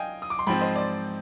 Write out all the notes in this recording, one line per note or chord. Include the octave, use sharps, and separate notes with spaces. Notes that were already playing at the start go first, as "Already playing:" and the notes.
Already playing: D#5 F5 G5 G#5
D#6
D6
C6
G#2 F3 C4 G5 B5
C5 D#5
D5